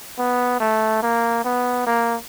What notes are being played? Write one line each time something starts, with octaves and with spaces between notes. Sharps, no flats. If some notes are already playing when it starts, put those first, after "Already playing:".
B3
A3
A#3
B3
A#3